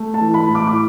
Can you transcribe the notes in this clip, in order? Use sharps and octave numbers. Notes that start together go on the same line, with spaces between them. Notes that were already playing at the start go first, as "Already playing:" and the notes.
Already playing: A3
A5
E3
B5
A2
D6
D6